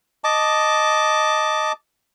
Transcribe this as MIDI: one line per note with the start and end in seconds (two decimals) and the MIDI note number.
0.24 1.72 75
0.24 1.72 81
0.24 1.72 86